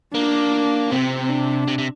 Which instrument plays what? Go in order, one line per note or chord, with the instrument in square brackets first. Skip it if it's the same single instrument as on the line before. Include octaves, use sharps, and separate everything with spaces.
[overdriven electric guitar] A#3 [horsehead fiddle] D4
[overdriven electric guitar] C3 [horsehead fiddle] C4
[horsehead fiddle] D4
[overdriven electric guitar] C3
C3